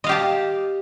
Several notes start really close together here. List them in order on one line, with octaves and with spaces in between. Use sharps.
D#5 F5 G4 A5